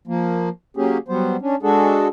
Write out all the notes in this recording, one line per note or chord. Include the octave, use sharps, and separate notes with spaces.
F3 A#3
F#3 A#3 C#4 G4 G#4
F#3 G3 B3 C5
C#4 D4
G#3 D4 F#4 G#4 A4